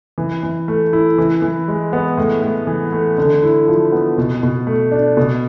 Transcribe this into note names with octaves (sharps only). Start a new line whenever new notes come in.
E3
E3
A3
E4
E3
E3
G#3
B3
A2
A2
E3
A3
D3
E4
F3
B3
B2
B2
A3
D4
B2